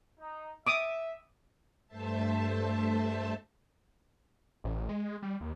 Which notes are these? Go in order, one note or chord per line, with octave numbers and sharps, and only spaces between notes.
D#4
E5 D6 D#6
G2 A3 C5 E5 A5
A1
G#3
G3
D#2